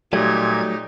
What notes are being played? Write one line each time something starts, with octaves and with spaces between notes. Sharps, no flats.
A#2 F#3 G3 A3 D#4 G4 G#6